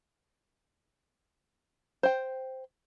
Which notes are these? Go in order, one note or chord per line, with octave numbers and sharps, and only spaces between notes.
C5 G5